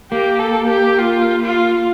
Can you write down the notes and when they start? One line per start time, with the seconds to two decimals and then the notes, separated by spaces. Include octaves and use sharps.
0.11 A#3 G4
0.40 A4
0.70 G4
0.99 F4
1.43 F4